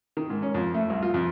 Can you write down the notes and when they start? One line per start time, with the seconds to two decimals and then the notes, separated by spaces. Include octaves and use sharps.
0.17 D#3
0.30 G#2
0.42 C#4
0.54 F2
0.74 A3
0.90 C2
1.02 F4
1.14 F2